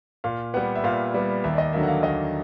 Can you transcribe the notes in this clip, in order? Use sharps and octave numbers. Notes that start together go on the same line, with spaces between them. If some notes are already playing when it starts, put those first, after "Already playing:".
A#2 F5
G3 B3 F#5
E5
A#2 F5
G3 B3
D#2 E5
D5
D#5
D3 F#3 A#3 E5
F#5
F5
D#2 D#5